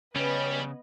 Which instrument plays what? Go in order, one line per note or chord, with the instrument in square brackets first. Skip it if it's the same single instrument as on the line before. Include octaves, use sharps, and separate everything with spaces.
[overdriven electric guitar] C#3 [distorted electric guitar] G3 [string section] B3 B4 D#5 [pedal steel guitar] C#4